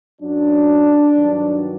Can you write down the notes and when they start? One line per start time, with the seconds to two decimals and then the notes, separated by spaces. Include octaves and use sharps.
0.21 F#2 F#3 D4
1.14 G2 D#3 F#3